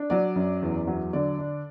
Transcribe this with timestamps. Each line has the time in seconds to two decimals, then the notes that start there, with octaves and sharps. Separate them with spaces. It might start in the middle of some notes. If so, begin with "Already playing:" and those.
Already playing: D4
0.10 F#3 D5
0.36 F#2
0.62 E2
0.87 F#3
1.13 D3 D5
1.39 D4